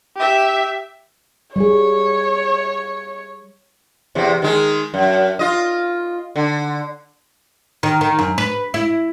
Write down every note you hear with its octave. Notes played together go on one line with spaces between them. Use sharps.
G4 E5
G3 G#4 C#5
E2 C3
D#3 G#3
F#2
F4 D#5
D3
D#3
D#3
F#2
B4
E4